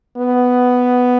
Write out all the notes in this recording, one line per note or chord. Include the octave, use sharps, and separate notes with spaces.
B3